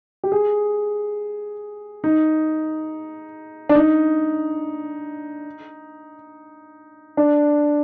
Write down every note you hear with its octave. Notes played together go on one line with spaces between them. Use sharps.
G4
G#4
D#4
D4
D#4
D4